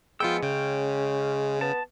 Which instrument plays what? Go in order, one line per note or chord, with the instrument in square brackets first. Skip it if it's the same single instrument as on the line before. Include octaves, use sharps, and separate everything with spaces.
[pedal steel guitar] F3 B3 E6 [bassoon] G#3 [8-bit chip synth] F4 G5
[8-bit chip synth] C#3 [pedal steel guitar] C#4 G5
[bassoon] B3 [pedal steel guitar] A5